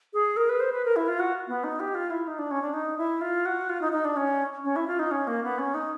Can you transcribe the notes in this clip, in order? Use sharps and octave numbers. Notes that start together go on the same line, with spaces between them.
G#4
A#4
B4
C5
B4
A#4
E4
F4
F#4
B3
D#4
G4
F4
E4
D#4
D4
C#4
D4
D#4
E4
F4
F#4
F4
D#4
D#4
D4
C#4
C#4
E4
F4
D#4
C#4
A#3
B3
C#4
D#4